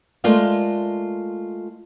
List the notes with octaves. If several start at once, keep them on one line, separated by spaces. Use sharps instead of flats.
G#3 A3 F4 A#4 D5 F5